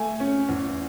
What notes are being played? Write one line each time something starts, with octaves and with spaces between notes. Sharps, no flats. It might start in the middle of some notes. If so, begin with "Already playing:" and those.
Already playing: A3 G#5
C#4
E2